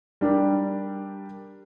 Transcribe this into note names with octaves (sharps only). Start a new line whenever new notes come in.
G3 D4 G4 A#4